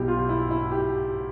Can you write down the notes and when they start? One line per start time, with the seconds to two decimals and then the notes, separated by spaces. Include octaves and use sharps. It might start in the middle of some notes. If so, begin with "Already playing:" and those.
Already playing: B1 B2 E4 G4
0.08 F4
0.29 E4
0.51 E4
0.71 G4